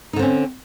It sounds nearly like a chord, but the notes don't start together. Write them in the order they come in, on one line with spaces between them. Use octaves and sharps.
D#4 D3 C4 C#4